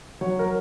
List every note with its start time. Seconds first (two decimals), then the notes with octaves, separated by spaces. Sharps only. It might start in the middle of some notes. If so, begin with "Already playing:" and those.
0.21 F#3 C#5
0.39 A#4